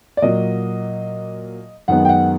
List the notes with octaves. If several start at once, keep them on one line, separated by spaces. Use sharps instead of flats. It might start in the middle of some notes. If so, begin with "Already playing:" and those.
D5
A#2 F#3 A#3 D#5
F#2 D#3 G#3 B3 F#5
G5
F#5